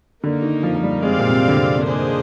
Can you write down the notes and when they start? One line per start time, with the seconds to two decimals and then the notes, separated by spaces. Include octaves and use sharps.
0.22 D3 A#3 D#4 A#4
0.42 D#3
0.63 F3
0.75 F3
0.83 G3
1.03 G#3 C4 G4 D5 F5
1.19 A#2
1.30 C3
1.48 D3
1.56 C3
1.83 A#3 D4 G#4 C5 D#5